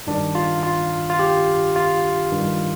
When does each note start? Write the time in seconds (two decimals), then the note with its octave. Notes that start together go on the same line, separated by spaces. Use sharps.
0.07 G2 D#3 D4
0.35 F4
0.63 F4
1.10 F4
1.19 G4
1.76 F4
2.32 G2 D#3